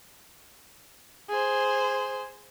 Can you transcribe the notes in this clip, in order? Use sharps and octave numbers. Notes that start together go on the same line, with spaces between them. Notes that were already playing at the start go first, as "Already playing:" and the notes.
G#4 C5